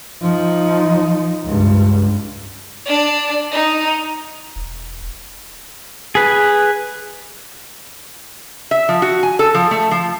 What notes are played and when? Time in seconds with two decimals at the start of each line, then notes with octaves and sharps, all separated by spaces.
0.22 F3 D#4
1.45 C#2 G2
2.85 D4 D5
3.51 D#4
4.56 E1
6.15 G#4 B4
8.71 E5
8.89 F3
9.02 F#4
9.23 G#5
9.39 A4
9.55 F3
9.71 A3
9.91 F3